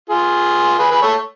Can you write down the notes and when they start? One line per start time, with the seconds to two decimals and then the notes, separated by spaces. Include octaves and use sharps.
0.09 F4 G#4
0.79 G#4 B4
0.91 G#4 B4
1.02 A4 C#5